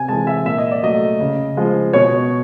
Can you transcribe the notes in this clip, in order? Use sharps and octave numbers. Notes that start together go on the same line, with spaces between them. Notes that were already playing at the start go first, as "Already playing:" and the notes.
Already playing: C3 G#5
E3 G#3 A5
E5
A#2 E5
D#5
D5
F#3 A3 D#5
C#3
F3 G#3
B2 C#5